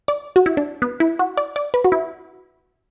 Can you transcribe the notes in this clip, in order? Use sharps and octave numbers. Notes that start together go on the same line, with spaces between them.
D5
F#4
E4
D4
B3
E4
F#4
D5
D5
B4
F#4
E4